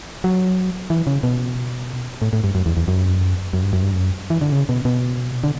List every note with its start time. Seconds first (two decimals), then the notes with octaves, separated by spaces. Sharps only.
0.24 F#3
0.90 E3
1.07 C#3
1.23 B2
2.22 A2
2.33 A2
2.44 G2
2.55 F#2
2.66 E2
2.77 E2
2.88 F#2
3.53 F#2
3.63 G2
3.73 F#2
3.82 G2
3.92 F#2
4.30 E3
4.41 D3
4.52 C#3
4.69 B2
4.85 B2
5.44 D3